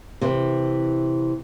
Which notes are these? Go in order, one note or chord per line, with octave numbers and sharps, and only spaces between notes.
C3 E3